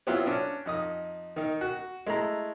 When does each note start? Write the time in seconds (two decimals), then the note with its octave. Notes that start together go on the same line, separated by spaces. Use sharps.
0.07 F#3 B3 C4 E4 F4
0.26 C#4 D4
0.66 F2 D#4 D#6
1.36 D#3 D#4
1.61 F#4
2.07 G#3 A3 E4 A#5